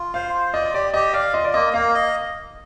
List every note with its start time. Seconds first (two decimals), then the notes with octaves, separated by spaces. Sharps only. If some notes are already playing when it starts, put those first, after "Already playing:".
Already playing: F4
0.14 C5 F5
0.34 F4
0.54 D5 D#5
0.74 G4 D5
0.94 G4 D#5
1.13 D5 F5
1.33 F4 D#5
1.44 D5
1.54 A#3 D#5
1.73 A#3 F5
1.94 D#5